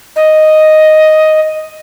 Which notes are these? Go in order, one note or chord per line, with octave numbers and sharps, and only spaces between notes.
D#5